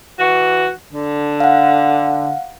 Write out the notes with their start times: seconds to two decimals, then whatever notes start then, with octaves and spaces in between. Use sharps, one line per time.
0.19 E3 F#4
0.91 D3
1.40 F5 F#5